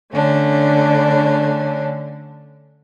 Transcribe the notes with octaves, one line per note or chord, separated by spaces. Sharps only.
D3 A3 C#4 D4